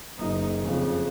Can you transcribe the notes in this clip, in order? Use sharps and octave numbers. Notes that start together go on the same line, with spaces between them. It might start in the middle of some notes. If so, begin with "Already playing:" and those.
F#1 D#4
F2 C#3